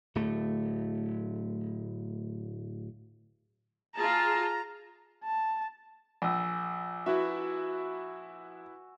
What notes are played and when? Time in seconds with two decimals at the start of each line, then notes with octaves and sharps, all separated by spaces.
0.15 D1 A3
3.97 F4 G#4 A5 A#5
5.24 A5
6.22 A#1 G#5 E6
7.06 E4 F#4 B4 E5